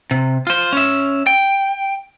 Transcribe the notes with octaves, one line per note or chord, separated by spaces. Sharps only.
C3
F4 C5
C#4 E5
G5